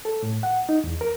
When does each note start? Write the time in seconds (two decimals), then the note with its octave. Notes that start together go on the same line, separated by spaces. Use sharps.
0.05 A4
0.23 A2
0.43 F#5
0.69 D#4
0.84 E2
1.01 A#4